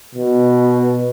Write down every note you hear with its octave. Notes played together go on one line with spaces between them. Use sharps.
B2